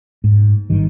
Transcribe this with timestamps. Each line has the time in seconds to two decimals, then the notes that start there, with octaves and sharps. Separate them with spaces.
0.24 G#2
0.70 G#1 G2 D#3